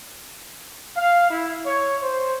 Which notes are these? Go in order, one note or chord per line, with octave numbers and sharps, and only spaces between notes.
F5
E4
C#5
C5